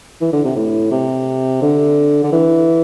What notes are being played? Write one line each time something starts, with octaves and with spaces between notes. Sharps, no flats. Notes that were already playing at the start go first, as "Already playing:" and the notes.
E3
D3
C3
A2
C3
D3
D3
E3